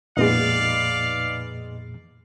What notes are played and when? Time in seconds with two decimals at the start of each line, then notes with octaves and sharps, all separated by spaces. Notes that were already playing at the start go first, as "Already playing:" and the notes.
0.17 F2 A#2 G#3 B3 D#4 D5 F5